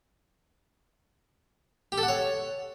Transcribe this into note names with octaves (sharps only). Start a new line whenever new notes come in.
G4
A4
F#5
C#5